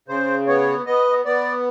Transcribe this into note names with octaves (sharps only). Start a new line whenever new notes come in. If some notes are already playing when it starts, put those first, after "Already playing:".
C#3 C5
B3 C#5
B3 D#5
B3 D5